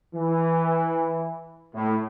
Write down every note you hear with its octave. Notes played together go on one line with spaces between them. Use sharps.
E3
A2